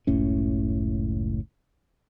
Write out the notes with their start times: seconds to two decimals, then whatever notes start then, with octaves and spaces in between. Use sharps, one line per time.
0.07 F#1 C#2 A2 C#4